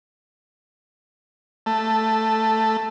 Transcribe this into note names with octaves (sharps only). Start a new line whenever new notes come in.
A3